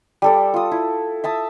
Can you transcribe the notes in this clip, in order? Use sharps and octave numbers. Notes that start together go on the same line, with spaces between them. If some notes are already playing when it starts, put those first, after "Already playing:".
G3 A4 D5
F4 D#6
E4
E5 A5 D#6